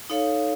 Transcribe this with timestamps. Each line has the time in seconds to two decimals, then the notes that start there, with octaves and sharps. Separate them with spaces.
0.10 D#4 A4 C#5 F5